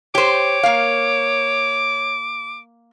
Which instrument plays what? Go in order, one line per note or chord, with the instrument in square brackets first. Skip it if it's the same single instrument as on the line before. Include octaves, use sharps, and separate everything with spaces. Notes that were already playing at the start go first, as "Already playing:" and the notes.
[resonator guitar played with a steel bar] G4 C5 [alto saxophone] C#5 [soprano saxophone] D6
[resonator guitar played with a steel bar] A#3 F5